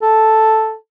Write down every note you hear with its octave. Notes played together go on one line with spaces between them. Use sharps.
A4